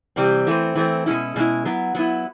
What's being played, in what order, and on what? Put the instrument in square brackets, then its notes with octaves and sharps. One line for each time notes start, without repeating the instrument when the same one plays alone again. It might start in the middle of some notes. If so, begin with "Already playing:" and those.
[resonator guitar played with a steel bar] C3 E3 G3 C4
E3 A3 C4
E3 A3 C4
B2 G#3 C#4 E4
B2 G#3 C#4 E4
F#3 B3 E4
F#3 B3 E4